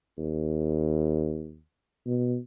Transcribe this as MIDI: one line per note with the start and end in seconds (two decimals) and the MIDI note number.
0.18 1.58 39
2.06 2.37 47